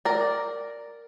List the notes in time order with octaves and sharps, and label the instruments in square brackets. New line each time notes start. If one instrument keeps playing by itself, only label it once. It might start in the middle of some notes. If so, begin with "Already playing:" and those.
[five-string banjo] A#4 D5